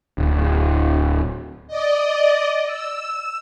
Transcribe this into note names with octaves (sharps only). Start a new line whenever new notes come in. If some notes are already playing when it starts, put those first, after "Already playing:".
D1
D5 D#5
E6